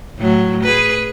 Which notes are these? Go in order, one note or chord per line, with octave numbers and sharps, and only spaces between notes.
A2 F#3
G#4 B4